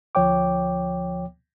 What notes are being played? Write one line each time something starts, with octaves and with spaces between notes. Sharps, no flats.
D2 F3 C#5 G5 D6